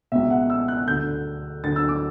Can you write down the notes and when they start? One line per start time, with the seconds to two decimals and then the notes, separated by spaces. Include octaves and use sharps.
0.12 C#2 B2 E5
0.30 F#5
0.50 E6
0.68 F#6
0.87 D2 D3 G6
1.63 D2 D3 A6
1.76 E6
1.89 D6